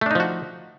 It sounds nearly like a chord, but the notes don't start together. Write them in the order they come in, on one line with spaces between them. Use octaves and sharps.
A3 D4 D#4 F3 F#4